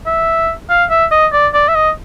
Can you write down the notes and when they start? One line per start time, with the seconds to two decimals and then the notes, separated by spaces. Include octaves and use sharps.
0.06 E5
0.70 F5
0.90 E5
1.11 D#5
1.33 D5
1.54 D5
1.68 E5
1.75 D#5